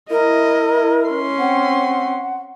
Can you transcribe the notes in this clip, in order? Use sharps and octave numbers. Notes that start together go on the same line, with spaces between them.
E4 A#4 D#5
C#4 C6
C4 F#5